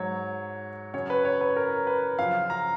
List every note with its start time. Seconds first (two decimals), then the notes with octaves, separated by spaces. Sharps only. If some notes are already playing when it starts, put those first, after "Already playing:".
Already playing: G#2 F#3 C#5
0.94 F#2 C#3 F#3 C#5
1.10 B4
1.25 C#5
1.41 B4
1.56 A#4
1.87 B4
2.19 F#2 C#3 F3 F5
2.50 A#5